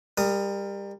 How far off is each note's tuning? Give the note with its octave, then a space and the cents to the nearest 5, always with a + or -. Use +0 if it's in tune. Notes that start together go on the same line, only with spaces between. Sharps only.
G3 +25 A#4 -10 D#6 +0